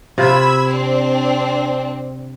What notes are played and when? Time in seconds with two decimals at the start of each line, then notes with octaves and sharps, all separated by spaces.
0.18 C3 F4 F5 B5 E6 G#6
0.69 C4 D4